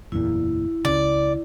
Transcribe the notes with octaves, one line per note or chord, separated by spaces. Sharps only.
F#1 E2 A#2 E4
C#2 C#3 D5